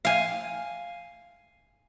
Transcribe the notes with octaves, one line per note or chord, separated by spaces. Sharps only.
F5 G#5